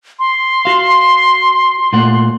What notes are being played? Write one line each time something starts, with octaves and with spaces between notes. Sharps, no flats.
C6
F#4 F5
A#2 A3 F#5